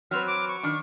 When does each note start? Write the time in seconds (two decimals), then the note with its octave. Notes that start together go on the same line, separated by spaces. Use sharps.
0.11 F#3 C4 B4 F6
0.27 D6
0.48 C#6
0.63 D#3 D4